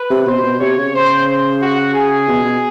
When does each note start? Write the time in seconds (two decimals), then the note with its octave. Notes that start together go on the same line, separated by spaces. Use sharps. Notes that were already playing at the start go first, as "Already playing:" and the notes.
Already playing: B4
0.10 C3
0.26 B2 C5
0.44 B2
0.60 C3 C#5
0.77 C#3
0.94 C5
1.28 C5
1.61 F#4
1.94 G#4
2.28 B2
2.45 B2